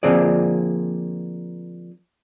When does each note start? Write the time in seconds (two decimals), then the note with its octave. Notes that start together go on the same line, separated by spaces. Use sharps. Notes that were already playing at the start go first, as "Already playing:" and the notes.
0.03 D3 F3 A#3 C4 G#4 D5